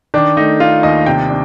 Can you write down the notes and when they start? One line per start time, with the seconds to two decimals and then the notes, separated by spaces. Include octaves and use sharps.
0.14 D#3 D4
0.37 A3 D#4
0.60 D4 F4
0.83 D#2 D#5
1.06 C3 G5
1.30 D4